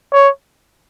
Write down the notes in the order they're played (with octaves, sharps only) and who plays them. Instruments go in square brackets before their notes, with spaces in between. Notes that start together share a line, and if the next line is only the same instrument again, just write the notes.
[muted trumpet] C#5